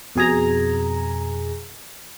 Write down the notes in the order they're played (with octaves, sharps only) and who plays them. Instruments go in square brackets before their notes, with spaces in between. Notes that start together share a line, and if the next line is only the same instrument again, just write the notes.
[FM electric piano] F2 B2 G#4 G#5 A#5